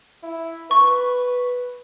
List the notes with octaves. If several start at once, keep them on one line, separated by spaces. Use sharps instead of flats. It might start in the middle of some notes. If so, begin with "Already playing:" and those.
E4
B4 C#6